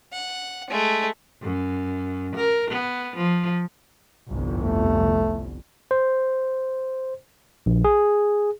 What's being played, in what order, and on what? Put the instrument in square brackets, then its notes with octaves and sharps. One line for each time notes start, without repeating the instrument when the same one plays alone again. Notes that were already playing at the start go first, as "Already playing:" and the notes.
[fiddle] F#5
G#3 A3
[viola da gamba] F#2
A#4
B3
F3
[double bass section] G1 C2 F2
[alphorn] A3
[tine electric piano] C5
A#1
G#4